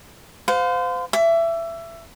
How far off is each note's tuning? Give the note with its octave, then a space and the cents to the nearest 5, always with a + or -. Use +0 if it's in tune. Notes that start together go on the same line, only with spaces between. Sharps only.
C5 -35 F5 +25
E5 +20 D6 -30